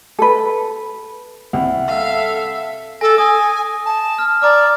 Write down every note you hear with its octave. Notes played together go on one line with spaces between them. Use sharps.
A4 B4
C2 F#5
A4 E5 F5
A4 G#5 A#6
G#5 D#6
A5
F6
D5 A#5 D6 F6